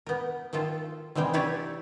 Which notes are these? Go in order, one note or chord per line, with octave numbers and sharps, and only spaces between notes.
B3 A#4
D#3 A#3 F4 A4
C3 E3 G3 G#3 G5
E4 G4 B4 C#5 D5 F#5